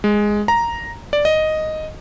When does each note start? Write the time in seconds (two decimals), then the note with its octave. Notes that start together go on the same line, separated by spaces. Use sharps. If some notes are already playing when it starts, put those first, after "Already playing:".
0.04 G#3
0.48 A#5
1.13 D5
1.25 D#5